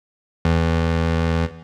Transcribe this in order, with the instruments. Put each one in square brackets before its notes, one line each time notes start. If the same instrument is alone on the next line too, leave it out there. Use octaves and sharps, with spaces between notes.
[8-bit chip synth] E2